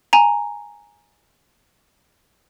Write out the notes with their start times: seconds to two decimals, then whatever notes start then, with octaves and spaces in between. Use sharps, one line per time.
0.13 G#5 A#5